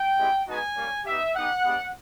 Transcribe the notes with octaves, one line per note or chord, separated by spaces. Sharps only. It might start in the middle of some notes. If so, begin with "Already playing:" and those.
Already playing: G5
G#3 C4 E4 G4
G#3 B3 D#4 F#4 G#5
G3 A#3 C#4
B3 D#4 G4 E5
B3 D#4 G4 F#5
G#3 B3 D4 G4